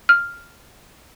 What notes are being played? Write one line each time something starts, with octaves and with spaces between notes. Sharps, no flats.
F6